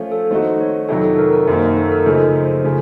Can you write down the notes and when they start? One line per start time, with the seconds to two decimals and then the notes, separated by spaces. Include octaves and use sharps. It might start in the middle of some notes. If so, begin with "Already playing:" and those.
Already playing: F3 A3 C#4 F4
0.12 A4
0.31 D#3 A3 C4 D#4 F#4 C5
0.60 C#5
0.89 F2 C3 D#3 F#3 A4
1.04 A4
1.18 A#4
1.33 A#4
1.47 F#2 D#3 F#3 A#3 C5
1.77 A4
1.91 A#4
2.06 C#3 F3 A3 D#4 C5
2.34 C5
2.64 C#3 F3 A3 C5